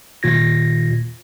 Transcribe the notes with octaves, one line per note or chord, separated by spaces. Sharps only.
A#2 D#3 F4 G#6 A#6